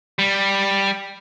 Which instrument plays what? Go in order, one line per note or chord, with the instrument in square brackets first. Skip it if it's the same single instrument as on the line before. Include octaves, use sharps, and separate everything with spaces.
[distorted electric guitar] G3